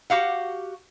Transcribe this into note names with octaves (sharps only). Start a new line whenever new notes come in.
F#4 G4 F5 F#5